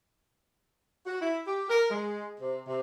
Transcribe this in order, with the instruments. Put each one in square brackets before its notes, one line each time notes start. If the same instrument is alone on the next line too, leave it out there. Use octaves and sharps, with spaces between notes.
[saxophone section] F#4
E4
G4
A#4
G#3
C3
C3